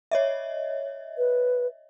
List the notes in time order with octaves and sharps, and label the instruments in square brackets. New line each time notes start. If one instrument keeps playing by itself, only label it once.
[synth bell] C#5 D#5 E5
[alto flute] B4